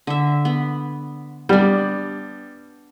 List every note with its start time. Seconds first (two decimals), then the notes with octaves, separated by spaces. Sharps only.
0.07 D3 E5
0.45 B3
1.49 G3 B3 D4